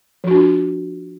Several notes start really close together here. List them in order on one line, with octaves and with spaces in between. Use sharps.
F3 F#4 D4 F4